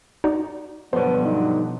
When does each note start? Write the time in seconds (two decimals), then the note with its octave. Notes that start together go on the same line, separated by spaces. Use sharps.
0.24 D#4 F#4 D5
0.93 G2 B2 D3 F3 F#3 B3 C5 C#5
1.25 D#4